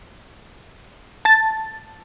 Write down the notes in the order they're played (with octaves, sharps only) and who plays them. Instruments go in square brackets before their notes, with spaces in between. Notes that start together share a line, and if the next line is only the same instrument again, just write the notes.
[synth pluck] A5 A6